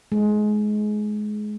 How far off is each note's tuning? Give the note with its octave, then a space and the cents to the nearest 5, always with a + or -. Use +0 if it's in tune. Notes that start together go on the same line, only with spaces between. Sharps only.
G#3 +25